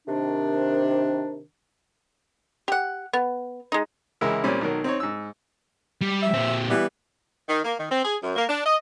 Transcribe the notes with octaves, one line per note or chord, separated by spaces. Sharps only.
C3 D#3 D4
G4 F#5
B3
G#3 D#4
C#2 E3 G#3 E4 A#4 E6
A#2 G3 C4 C#4
B1 D#3 F#3 A#4
C4 D#4 C#5
G#2 E6
G3
E5
A#2 C4
E3 G3 B3
D#3
A#3
D#3
C4
G#4
F#2
A#3
D4
D#5